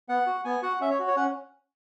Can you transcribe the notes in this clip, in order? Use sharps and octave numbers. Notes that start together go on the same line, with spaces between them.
B3 F#5
F#4
B3 G#5
F#4 F#5
C#4 E5
C#5
F#4
C#5
C#4 F#5